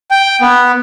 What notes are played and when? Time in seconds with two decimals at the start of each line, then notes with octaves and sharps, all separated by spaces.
0.11 G5
0.41 B3